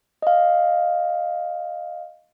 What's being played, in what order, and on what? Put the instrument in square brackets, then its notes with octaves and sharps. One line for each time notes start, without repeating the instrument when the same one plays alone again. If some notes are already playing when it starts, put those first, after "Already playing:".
[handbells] D#5 F5